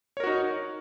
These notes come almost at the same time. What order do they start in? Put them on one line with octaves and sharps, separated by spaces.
C#5 A#4 F#4 D#4